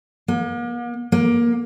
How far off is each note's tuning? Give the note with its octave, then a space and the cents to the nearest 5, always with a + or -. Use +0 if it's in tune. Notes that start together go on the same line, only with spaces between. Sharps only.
A#3 +45
A#3 +20